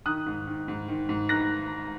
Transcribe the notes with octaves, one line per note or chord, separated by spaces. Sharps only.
D#3 D#6 F#6
G#2
D#3
G#2
D#3
G#2
D#3 F#6 A#6